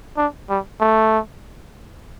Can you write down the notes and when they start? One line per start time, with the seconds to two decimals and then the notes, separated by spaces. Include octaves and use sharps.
0.17 D4
0.49 G3
0.80 A3